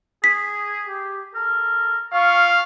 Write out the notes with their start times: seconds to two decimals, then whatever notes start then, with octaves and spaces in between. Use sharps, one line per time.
0.24 G#4 B6
0.87 G4
1.35 A4 A#4
2.14 F4 F5 C#6